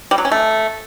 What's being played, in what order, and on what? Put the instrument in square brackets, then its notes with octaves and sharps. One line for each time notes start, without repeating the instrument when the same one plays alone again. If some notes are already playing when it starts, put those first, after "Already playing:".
[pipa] G3
F#3
C#4
A3